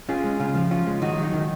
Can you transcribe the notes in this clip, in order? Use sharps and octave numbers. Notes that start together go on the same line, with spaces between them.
C#4 F4 G#4
G#3
C#3 F4
F3
C#4 F4
G#3
D#3 D#4 F#4
F#3 D#4
D#3